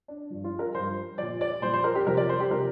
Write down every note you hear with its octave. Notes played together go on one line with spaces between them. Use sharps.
D4
G2 F3
F4
A#4
G2 F3 C5
A#2 F3 D5
D5
A#2 F3 C5
C5
A#4
G4
F2 C3 F3 A#4
D5
C5
G4
C3 F3 A#4